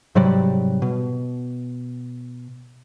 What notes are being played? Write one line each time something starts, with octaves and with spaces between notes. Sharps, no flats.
G#2 C3 F#3 G3
B2